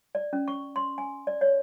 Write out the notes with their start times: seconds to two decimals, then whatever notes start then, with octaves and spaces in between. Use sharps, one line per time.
0.15 D5
0.33 C#4
0.48 C#6
0.76 C6
0.98 G#5
1.27 D5
1.41 C#5